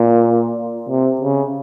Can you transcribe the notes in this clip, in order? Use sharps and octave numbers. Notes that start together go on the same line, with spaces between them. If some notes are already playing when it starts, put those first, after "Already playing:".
Already playing: A#2
C3
C#3